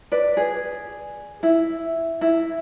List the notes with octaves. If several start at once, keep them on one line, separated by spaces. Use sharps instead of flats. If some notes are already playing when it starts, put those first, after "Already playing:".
B4 D5
G#4
E4
E4